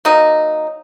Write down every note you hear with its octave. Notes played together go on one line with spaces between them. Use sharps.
F#3 A#3 D#4